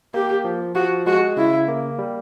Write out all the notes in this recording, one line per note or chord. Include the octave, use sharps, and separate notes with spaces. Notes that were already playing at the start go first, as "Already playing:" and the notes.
A#3 G4
F3
F3 F#4
G#3 F#4
C#3 E4
A#3
G3